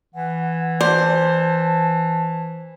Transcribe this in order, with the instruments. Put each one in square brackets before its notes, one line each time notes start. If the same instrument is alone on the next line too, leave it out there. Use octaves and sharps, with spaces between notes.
[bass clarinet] E3 [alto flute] F#5
[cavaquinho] C5 [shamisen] D5 [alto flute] A5